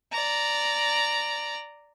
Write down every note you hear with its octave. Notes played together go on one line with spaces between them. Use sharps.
D5 A#5